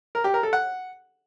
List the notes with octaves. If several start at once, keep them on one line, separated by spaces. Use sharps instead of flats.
A#4
G4
A#4
A4
F#5